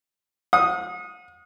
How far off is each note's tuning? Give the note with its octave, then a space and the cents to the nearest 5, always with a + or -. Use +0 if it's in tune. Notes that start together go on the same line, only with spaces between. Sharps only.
F#5 -45 D#6 +0